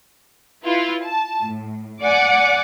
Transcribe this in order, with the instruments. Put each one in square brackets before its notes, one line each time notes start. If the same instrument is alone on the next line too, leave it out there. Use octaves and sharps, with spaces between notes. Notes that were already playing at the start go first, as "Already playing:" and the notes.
[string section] E4 F4 B4
A5
A2
D5 F#5 G#5 D6